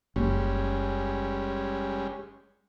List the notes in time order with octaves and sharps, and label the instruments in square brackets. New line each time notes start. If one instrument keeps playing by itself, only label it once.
[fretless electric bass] F#1 [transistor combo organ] G3 G#3 C#4